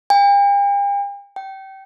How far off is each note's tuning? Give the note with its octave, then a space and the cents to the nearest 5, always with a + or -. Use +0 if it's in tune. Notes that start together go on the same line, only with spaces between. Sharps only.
G5 +45
G5 -25